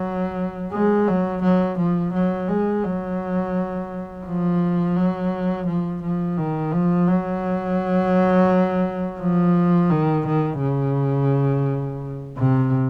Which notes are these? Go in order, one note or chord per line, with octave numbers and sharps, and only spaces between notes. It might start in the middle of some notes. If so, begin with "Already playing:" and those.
Already playing: F#3
G#3
F#3
F#3
F3
F#3
G#3
F#3
F3
F#3
F3
F3
D#3
F3
F#3
F3
D#3
D#3
C#3
C3